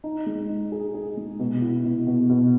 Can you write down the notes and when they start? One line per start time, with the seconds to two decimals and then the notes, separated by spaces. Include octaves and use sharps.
0.04 D#4
0.26 G#3
0.49 D#4
0.72 G#4
0.94 G#4
1.17 G#3
1.39 B2
1.62 E4
1.84 B2
2.07 B2
2.29 B2